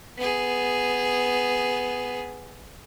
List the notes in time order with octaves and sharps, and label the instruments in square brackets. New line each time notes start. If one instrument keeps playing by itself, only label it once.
[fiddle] B3 G#4